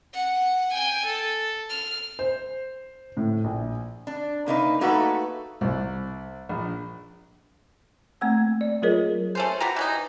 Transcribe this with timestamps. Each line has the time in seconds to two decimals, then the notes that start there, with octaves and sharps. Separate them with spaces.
0.14 F#5
0.70 G5 G#5
1.05 A4
1.69 F6
2.19 C5
3.17 A2
3.44 A#1
4.07 D4
4.46 C3 A#3 D#4 B4
4.81 A3 A#3 D#4 F#4 A4 B4
5.61 C2
6.49 A#1
8.21 A3 A#3 C4 F#5 E6 G#6
8.61 D5
8.82 F#3 F4 G#4 A#4 C#5 D#5
9.35 A3 C#4 C5
9.60 B2 G4 A#5
9.76 E3 C#4 D#4